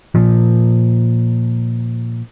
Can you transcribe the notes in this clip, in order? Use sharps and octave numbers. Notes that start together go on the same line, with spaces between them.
A#2 F3